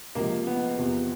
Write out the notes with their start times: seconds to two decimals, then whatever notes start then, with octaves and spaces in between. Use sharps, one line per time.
0.15 C#2 C3 F3 A#3
0.47 B3
0.78 E2 C3 F3